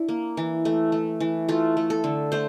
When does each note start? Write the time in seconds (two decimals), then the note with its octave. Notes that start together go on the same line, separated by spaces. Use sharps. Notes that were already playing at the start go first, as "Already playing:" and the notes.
Already playing: D4 E4
0.09 A#3
0.37 E3
0.65 A3
0.92 A3
1.20 E3
1.49 A3 F4
1.77 A3
1.90 A4
2.04 D3
2.32 A3 C5